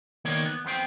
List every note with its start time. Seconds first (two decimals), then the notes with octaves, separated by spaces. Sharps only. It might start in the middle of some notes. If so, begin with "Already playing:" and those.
0.25 D#3 A#3 B3 C#5 D5
0.46 B3
0.65 F2 B3 C5 G5